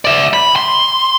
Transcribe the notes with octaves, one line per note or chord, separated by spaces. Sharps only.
D5 E5
B5
C6